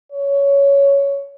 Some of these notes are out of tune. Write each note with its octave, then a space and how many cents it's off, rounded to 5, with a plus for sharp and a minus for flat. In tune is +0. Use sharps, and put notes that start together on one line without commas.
C#5 +10